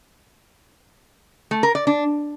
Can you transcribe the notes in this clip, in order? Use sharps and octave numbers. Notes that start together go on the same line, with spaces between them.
A3
A#4
D5
D4